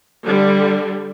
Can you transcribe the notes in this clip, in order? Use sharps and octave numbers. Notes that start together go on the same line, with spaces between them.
D3 G3